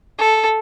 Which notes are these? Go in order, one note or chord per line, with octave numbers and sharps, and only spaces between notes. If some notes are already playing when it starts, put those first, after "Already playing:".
A4